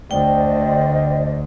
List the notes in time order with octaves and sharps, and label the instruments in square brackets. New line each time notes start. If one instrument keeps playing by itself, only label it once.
[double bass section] D2 [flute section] C5 D5 D#5 [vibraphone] G5